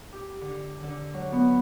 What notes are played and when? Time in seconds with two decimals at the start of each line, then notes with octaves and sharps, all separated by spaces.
0.13 G4
0.41 D3
0.83 D3
1.14 F#3
1.32 B3